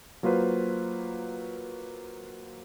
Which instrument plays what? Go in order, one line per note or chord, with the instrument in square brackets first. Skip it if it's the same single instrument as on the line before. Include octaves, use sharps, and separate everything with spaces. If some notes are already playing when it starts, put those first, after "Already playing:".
[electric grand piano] F#3 A#3 F4 F#4 B4 C5